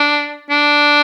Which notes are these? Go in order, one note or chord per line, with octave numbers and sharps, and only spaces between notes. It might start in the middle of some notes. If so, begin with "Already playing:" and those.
Already playing: D4
D4